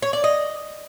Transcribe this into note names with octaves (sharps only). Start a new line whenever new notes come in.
C#5
D5
D#5